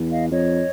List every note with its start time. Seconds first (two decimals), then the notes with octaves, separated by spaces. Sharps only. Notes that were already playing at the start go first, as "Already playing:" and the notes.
Already playing: E2
0.11 D#5 F5
0.31 F2 C#5 D#5